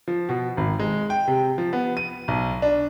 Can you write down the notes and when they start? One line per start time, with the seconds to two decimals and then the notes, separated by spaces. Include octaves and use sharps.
0.08 F3
0.29 B2
0.57 G#1
0.79 G#3
1.10 G5
1.27 C3
1.58 F3
1.73 B3
1.97 D#7
2.28 B1
2.62 D4